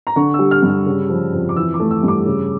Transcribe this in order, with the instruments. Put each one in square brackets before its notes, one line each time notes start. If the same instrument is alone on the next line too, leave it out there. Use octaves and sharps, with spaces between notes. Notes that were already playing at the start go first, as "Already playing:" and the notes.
[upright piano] A#5
D3 C#6
G3 E6
F6
G2
F6
C#3
F3
F2
D6
E3 E6
D6
A3
E6
G2
D6
C#3